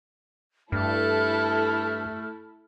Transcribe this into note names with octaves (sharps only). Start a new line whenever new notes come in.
G2 A3 E4 A4 F6